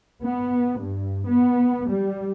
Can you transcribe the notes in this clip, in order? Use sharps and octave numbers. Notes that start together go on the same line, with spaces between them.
B3
G2
B3
G3